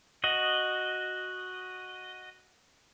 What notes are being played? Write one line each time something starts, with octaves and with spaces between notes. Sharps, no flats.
F#4 D#5